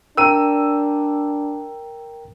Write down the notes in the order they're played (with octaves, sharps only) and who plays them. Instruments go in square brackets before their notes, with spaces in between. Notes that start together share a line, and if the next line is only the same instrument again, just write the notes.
[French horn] D4 [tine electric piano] A#4 G5 A#5 [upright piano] E6 D#7